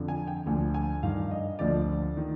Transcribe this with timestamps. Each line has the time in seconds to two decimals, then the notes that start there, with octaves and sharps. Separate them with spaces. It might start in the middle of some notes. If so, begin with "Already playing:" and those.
Already playing: F2 D3 F3
0.08 G#5
0.27 G5
0.46 D2 D3 F3 G#5
0.74 G#5
1.03 G2 D#3 F5
1.31 D#5
1.59 D2 D3 F3 D5
2.17 D#3